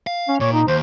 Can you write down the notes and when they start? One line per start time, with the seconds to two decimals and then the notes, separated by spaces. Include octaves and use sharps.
0.07 F5
0.28 C#4
0.40 A#2 C#5
0.53 D#4
0.68 D#2 C5